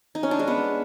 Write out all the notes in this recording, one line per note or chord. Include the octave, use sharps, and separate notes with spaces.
D#4
C#4
D4
G#3
B3